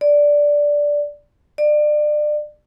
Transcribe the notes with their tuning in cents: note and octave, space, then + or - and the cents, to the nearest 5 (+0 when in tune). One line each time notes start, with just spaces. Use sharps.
D5 -5
D5 +30